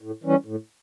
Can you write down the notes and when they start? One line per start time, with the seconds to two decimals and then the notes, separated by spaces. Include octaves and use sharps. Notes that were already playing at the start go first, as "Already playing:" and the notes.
0.01 A2
0.24 E3 G3 C#4
0.46 A2